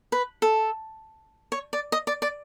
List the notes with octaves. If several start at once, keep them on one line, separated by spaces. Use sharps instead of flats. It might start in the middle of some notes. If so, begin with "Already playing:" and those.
B4
A4
C#5
D5
D#5
D5
D5